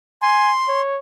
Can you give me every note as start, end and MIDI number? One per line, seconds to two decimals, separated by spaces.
0.22 0.52 80
0.22 0.81 84
0.68 0.99 73